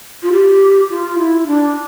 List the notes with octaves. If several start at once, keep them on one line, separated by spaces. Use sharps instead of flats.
F4
G4
F4
E4
D4